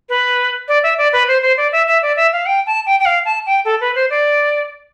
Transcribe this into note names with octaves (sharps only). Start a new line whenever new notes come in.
B4
D5
E5
D5
B4
C5
C5
D5
E5
E5
D5
E5
F5
G5
A5
G5
G5
F5
A5
G5
A4
B4
C5
D5